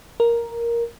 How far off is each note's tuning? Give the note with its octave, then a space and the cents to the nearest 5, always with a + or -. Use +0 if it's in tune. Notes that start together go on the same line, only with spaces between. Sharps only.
A#4 +5